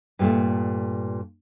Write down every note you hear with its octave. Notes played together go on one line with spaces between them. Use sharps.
G2 A#2 A3